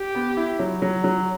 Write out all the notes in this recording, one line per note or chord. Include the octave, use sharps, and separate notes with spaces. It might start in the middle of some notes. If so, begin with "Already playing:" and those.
Already playing: G4
B3
E4
F#3
F#3
F#3